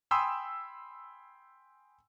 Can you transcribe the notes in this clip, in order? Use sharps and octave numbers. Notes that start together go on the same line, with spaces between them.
G5 G#5 B5 C6 D#6 E6